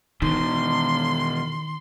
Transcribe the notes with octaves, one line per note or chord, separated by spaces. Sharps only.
E2 B2 D#3 C6